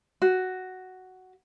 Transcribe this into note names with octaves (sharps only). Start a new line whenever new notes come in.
F#4